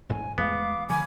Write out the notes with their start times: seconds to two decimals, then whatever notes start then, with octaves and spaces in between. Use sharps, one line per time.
0.09 A1 G#2 G#5
0.38 E2 G#3 A3 B3 F5 D6
0.90 D3 D#3 F3 G#5 B5 D6 G#6